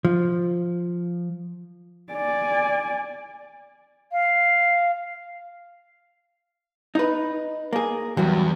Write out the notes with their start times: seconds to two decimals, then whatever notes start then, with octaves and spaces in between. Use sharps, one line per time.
0.05 F3
2.13 D5 G#5
4.12 F5
6.95 D#4 B4
7.73 A#3 G#4
8.17 E2 G2 F#3 F#4